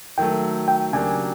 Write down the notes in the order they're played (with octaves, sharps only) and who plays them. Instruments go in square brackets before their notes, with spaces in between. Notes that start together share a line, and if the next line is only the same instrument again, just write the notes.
[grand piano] D#3 F#3 A3 [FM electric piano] G5
[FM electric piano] G5
[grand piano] C#3 F#3 A#3 D4 G4 [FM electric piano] G#5